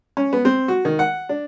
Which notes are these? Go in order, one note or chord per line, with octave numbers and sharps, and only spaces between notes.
C#4
B3
C4
F#4
D#3
F#5
D4